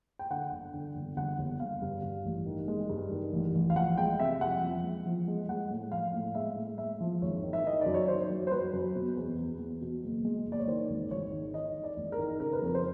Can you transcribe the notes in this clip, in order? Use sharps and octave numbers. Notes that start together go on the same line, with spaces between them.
G5
D3 F#5
G1
D3
G1
G1 F#5
G1
G1 F5
G2
G2
A1
D#3
G#3
G2
D#3
A1
A1
F5
F3 F#5
G#3 G5
C3 E5
F2 F#5
F3
G#3
F3
G#3
G#3 F#5
A2
F3 F5
A2
G#3 E5
A2
G#3 E5
F3
G#1 C#5
D#3
E5
D#3 D#5
F#2 D5
C#5
D#3 C5
F#3
C5
F#3 B4
F#2
B2
E2
E2
E2
B2
F#1
G#3
F#1
D5
C#5
D#3 C5
G#1
G#1 C#5
D#3
D#3 D#5
D#3
D5
G#1
A#4
D#3
C#3 A#4
B4
F2 A#4
C5